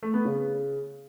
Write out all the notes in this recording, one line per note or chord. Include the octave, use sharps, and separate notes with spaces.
A3
B3
C#3